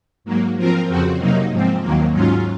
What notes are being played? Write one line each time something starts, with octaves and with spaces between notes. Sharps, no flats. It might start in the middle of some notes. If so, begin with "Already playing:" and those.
G#2 F#3 A#3
F3 C4 F4 A#4
F2 C#3 F3 C4 F#4
C3 F#3 A#3 D#4
G#2 F3 C4
D#2 D#3 F#3 A#3
G#2 F#3 C#4 F4